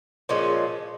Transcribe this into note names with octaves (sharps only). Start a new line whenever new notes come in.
A#2 F3 G#3 C#4